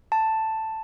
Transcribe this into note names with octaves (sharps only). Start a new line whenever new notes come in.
A5